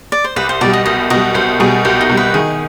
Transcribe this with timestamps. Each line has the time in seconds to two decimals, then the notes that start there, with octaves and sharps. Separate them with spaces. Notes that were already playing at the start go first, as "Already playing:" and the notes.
0.12 D5
0.24 C5
0.36 C2 B4
0.49 C5
0.61 B2 G3 D5
0.73 D#5
0.86 C2 D#5
1.10 B2 G3 D#5
1.34 C2 C5
1.60 B2 G3 G#4
1.85 C2 G4
2.01 D#4
2.09 B2 G3
2.17 B4
2.34 D#3 G#4